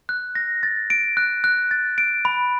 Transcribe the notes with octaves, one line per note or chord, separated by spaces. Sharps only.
F#6
A#6
A6
D7
F#6
F#6
A6
D7
B5